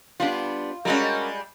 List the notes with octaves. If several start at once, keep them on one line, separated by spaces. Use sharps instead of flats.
G3 B3 D4 F4
G3 G#3 C#4 F#4 A#4